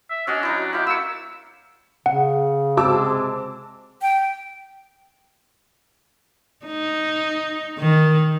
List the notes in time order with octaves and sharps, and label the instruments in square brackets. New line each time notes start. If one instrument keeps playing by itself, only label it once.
[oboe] E5
[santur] C#4 F#4 D#5 [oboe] D4
[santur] F#3 D#4 E4
[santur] E4 E5 F5 [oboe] G4
[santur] A#3 C#6 [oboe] E6
[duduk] C#3 [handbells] F#5
[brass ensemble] C3 G#3 C4 [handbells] F#4 [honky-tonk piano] A5 D6 E6
[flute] G5
[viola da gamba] D#4
D#3